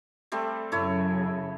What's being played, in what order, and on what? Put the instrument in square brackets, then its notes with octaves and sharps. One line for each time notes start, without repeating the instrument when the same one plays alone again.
[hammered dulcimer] G3 A3 C4
[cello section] F#2 C#3 [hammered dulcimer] A3 E4 C#5